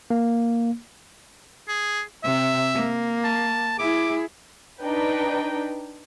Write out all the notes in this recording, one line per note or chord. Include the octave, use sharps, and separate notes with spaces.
A#3
G#4
C3 E5
A#3
A5
E4 G#4 D6
D4 D#4 B4 G5